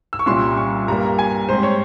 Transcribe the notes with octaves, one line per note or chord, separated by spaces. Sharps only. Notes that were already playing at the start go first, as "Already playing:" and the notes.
E6
C#6
C2 A#2 G3 C#4 C6
C#6
G2 G3 A#3 A#5
G#5
G#2 G3 C4 C5
C#5